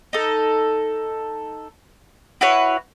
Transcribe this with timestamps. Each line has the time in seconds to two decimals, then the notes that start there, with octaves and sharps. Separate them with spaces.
0.13 D#4 A4
2.41 E4 F#4 B4 C#5